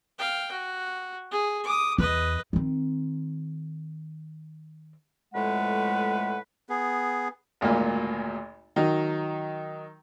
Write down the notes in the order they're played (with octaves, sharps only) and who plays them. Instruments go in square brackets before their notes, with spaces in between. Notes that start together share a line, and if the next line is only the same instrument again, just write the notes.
[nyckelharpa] F5 G5
F#4
G#4
D6 D#6
[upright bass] E2 [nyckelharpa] B4 D#5
[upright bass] D#3 C4
[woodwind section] F2 A2 G#3 A3 B4 F#5
[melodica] B3 G#4
[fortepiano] G#1 D2 A#2 A#3
D#3 F#3 D#4